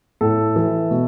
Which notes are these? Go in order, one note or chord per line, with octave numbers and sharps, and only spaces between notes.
A2 A4
E3
B2